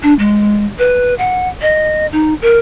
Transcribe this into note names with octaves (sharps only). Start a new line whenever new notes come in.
D4
G#3
B4
F#5
D#5
D#4
A#4